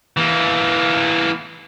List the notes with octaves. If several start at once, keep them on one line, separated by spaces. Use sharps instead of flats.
E3 A#3